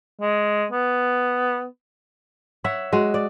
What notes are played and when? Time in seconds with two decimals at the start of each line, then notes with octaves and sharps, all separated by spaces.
0.21 G#3
0.71 B3
2.64 C#5 E5 F#5
2.92 G#3 F#4
3.14 D5